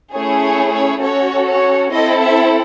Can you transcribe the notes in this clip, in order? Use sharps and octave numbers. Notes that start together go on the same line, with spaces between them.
A3 C#4 E4 G#4 C#5
C#5
C#5
C#4 F#4 A4 C#5
C#5
C4 E4 A4 D#5
E5